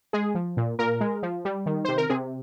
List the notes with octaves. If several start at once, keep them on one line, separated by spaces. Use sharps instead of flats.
G#3 G#4
F3
A#2
A#2 A#4
G#3
F3
G3
D#3
C3 C5
A#4
C3 G#4